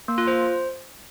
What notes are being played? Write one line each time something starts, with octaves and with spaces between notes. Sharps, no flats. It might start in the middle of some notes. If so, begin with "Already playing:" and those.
A#3
F4
C5